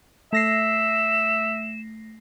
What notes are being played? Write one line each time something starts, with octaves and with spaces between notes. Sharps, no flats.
A3 E5 A#6 C7 E7